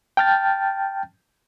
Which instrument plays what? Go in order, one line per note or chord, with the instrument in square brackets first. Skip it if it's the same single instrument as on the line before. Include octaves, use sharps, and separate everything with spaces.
[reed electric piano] G5 A5 F6 G6 A6